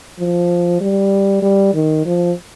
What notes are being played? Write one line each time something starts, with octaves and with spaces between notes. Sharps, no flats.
F3
G3
G3
D#3
F3